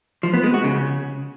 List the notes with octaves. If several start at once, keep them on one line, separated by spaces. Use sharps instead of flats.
F3
B3
G#3
F#4
C#3